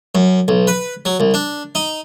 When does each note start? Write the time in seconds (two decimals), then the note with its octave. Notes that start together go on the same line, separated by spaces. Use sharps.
0.15 F#2
0.48 B1
0.67 B4
1.05 F#3
1.20 C2
1.34 D4
1.75 D#4